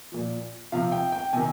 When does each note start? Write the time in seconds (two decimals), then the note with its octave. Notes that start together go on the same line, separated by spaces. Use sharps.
0.12 A#2 F3
0.72 C3 F3 F5
0.92 G5
1.12 G5
1.33 C3 D#3 G#5